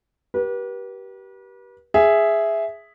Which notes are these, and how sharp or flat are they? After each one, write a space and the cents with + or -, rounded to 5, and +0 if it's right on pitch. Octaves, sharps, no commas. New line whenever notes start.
G4 -25 B4 -40
G#4 +0 E5 +0